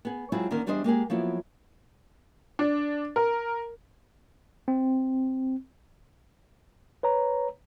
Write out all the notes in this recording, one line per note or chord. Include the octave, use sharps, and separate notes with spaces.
B3 G#4
F#3 G#3 C4 E4 F4 G#4
D3 D#3 A#3 C#4 A#4
E2 G3 D4 G#4 C5 D#5
G#3 A#3 G4 G#4
F3 F#3 A#3 B3 E4
D4
A#4
C4
B4 C#5 A#5